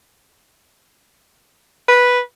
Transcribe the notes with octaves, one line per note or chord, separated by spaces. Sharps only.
B4